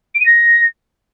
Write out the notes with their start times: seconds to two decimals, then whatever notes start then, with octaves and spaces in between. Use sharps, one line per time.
0.15 D7
0.20 D#7
0.26 A#6